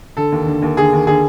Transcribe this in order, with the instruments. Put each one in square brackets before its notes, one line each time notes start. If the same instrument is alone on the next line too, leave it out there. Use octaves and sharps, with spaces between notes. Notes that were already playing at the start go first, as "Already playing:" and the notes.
[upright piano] D3 A4
D#2
D3
D#2
D3 G#4
D#2
D3 G#4